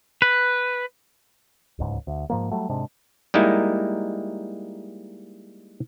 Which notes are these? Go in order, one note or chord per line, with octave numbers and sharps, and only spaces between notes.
B4
D1 C#2 G#2
D2
G#2 F3 A#3
F#3 G3 A3
G#2 C3 G#3 D4
G3 G#3 A#3 D#4 E4